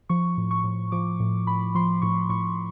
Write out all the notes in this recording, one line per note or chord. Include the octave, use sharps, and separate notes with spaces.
F3 C#6
A2
C#6
A2
F3 D6
A2
A2 B5
F3 C6
A2 C#6
A2 C#6